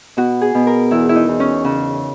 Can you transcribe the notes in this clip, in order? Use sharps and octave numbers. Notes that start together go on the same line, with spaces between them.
B2 F#4
G#4
B2
A#4
E2 E4
E4
D#4
E2
C#4
C#3